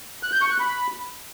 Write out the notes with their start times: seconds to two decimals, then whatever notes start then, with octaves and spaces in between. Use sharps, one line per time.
0.23 F#6
0.32 G6
0.41 C#6
0.50 F#6
0.60 B5